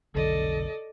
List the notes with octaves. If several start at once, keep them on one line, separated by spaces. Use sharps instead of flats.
F1 B1 D3 A4 D5 D#5